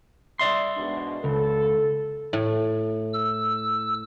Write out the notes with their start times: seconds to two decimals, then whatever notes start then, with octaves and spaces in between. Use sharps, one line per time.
0.39 D5 E5 C6
0.77 G#2 B2 D4
1.24 C#2 A4
2.33 A2
3.13 E6